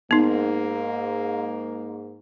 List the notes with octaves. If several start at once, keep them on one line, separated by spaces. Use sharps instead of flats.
G#2 A#3 B3 D#4